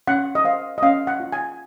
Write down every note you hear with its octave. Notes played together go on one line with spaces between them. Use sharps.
C#4 F#5
D#5
C5 F5
D#5
C#4 F5
F#5
F4
G#5